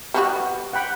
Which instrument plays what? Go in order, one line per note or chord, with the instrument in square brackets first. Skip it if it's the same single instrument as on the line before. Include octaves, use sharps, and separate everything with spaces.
[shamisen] G3 B3 F#4
[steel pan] F#5 G5 B5